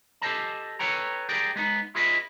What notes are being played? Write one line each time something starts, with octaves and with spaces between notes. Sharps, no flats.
G4 A4 C5 D#5 A5
A4 B4 C#5 G5 A#5
G4 G#4 A#4 D5 G5
G#3 B3 D#4
E4 F4 G#4 B4 D#5 E5